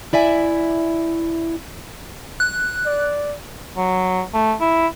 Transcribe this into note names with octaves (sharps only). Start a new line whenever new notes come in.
E4 D5 E5 G#5
F#6
D5
F#3
A3
E4